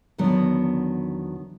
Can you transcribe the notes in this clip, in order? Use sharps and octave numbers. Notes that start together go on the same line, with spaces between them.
E2 D3 D#3 F#3 B3